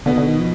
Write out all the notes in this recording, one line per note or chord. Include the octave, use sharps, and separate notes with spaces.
B2 D3 B3 D#4
D3
D#3
F3